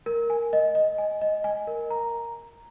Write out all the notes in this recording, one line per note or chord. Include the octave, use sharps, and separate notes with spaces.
A#4
G#5
D#5
D#5
G#5
D#5
G#5
A#4
A#5